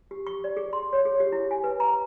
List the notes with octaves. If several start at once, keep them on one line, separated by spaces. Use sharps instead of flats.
G4
C#6
D5
G#4
C6
C#5
G#4
G4
E4
G#5
B4
A#5